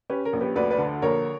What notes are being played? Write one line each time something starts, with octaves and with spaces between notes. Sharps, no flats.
C#4 G4 B4
A#4
A#1
G4 B4
D2 B4 D5
B4 D5
D3
A#1 A#4 C#5